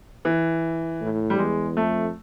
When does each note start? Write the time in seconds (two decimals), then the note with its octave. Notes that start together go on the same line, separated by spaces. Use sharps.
0.25 E3
1.01 A2
1.30 G3
1.38 E2 G#3
1.76 F2 A3